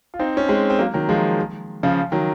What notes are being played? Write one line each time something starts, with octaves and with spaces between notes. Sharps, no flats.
F4
C4 D#4
C#4
G#3 C4
C4
F#3 A#3
D#3 F#3
F3 G#3
C#3 F3
D#3 F#3